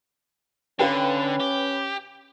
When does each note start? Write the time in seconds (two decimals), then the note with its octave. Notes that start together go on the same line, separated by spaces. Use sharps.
0.79 D3 C#4 B4 F5 G5
1.40 G4